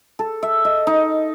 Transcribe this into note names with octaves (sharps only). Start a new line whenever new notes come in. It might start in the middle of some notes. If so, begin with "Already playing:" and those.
A4
E5
D#5
D#4